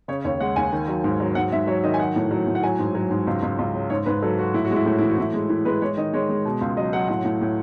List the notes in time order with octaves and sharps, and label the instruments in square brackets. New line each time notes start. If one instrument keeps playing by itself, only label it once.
[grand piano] C#3 C#5
D#2 C#5
G#3 F#5
D#2 G#5
D#3
F#3
G#2
F#3
G#2 F#5
G#2 E5
F#3 C#5
D#3 D#5
G#5
F#3 F#5
A2
F#3
A2
F#5
F#3 G#5
G#2
F#3
G#2
C#2
C#2
C#2
C#3
G#2 C#5
G#2 B4
F#3 A4
F#3 F#4
A2 E4
F#4
G#3
E4
A2 F#4
E3 E4
F#4
A2 E4
G#3
E3 E4
G#3 B4
G#3 C#5
D#3 D#5
G#3 C#5
G#3
B2
C#2
F#3 D#5
F#3 F#5
A2 F#5
A2
A2